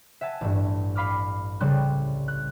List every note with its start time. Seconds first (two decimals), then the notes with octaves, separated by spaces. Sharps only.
0.21 E5 F#5 G#5 A5
0.41 A1 G2
0.95 F5 B5 D6 F6
1.60 C2 C#3 G3 A4 C6 F#6
2.28 F#6